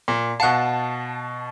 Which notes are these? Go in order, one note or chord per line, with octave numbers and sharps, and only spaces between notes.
A#2
B2 F5 F#5 A5 F#6